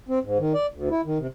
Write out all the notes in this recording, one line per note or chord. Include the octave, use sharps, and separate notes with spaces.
C4
G#2
D#3
D5
D2
E4
D#3
C3